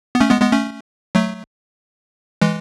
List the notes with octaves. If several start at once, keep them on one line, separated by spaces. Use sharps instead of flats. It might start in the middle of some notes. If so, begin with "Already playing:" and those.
B3
A3 C#4
G#3 B3
G#3 B3
A3 C#4
F#3 A3
E3 G#3